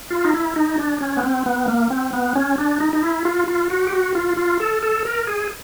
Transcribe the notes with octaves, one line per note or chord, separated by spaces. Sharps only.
F4
D#4
E4
D#4
D4
C#4
B3
C4
B3
A#3
C4
B3
C#4
D4
D#4
D#4
E4
F4
F4
F#4
G4
F#4
F4
F4
A4
A4
A#4
G#4